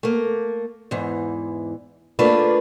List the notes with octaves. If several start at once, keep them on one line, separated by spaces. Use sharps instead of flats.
A3 A#3
E2 G#2 E3
A3 A#3 D4 F4 B4